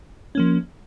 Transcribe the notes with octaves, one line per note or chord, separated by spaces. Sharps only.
F3 A#3 C#4